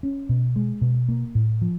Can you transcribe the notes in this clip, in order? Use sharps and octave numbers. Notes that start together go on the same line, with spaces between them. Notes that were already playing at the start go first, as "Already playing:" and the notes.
C#4
B2
G#3
B2
A#3
A2
F3